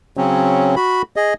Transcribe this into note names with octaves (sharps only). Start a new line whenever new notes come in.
C#3 F#3 C4 C#4
F#4 B5
G#4 D#5